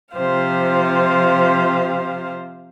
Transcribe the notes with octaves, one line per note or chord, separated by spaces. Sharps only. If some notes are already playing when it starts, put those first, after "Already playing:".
C3 F3 F4 C5 F5